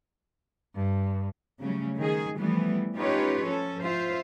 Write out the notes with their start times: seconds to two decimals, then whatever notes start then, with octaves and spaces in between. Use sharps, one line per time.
0.75 G2
1.61 C#3 F#3 G3 A3 C#4
1.97 D#3 G#4
2.38 E3 F3 G3 A3 B3
2.95 C#4 D#4 F4 G4 B4 C#5
3.42 F3 C#4 A4
3.82 F4 C5 E5